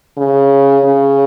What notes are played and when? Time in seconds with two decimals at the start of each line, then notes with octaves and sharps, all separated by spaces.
0.17 C#3
0.85 C#3